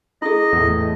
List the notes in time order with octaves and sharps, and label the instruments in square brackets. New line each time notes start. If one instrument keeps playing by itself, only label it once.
[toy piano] E4 G#4 [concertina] D#5
[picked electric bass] E2 A2